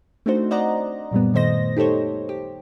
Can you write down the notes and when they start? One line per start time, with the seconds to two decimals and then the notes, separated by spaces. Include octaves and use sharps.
0.26 A3 C4 D4 D#4 F#4 C5
0.51 C5 D5 D#5 F#5 A#5
1.11 F#2 A#2 G3 B3
1.34 A#2 D#3 A3 C5 D#5 A#6
1.77 D#4 G4 A4 C5 C#5
2.29 G4